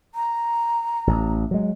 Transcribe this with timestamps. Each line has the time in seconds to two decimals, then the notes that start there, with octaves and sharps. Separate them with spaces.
0.15 A#5
1.07 A1
1.51 F#3 G#3